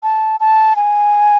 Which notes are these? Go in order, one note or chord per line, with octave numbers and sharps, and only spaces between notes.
A5
A5
G#5